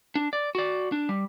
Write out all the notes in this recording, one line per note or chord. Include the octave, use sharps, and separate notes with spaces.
D4
D5
F#4 D5
D4
G3